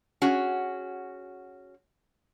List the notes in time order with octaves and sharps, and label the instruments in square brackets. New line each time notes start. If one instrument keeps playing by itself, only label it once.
[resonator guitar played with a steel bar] C#4 F#4 G#4